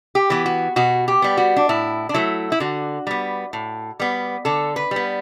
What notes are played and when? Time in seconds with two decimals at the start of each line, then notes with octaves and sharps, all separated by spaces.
0.15 G4
0.30 E3 B3
0.46 F#4
0.76 B2 F#4
1.08 G4
1.22 G3 B3
1.37 F#4
1.56 D4
1.69 A2 E4
2.09 D4
2.14 F#3 A3 E4
2.52 E4
2.60 D3 F#4
3.07 G3 B3
3.53 A2
4.00 G3 B3
4.45 D3 A4
4.76 B4
4.91 G3 B3